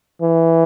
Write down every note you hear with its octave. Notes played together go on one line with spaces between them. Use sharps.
E3